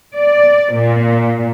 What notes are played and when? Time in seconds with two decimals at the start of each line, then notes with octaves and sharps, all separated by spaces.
0.15 D5
0.73 A#2